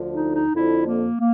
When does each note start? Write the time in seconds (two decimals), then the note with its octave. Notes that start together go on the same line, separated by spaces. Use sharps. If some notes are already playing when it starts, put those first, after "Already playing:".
Already playing: D2 D3 F3
0.12 D#4
0.33 D#4
0.54 F2 D3 F3 E4
0.85 A#3
1.18 A#3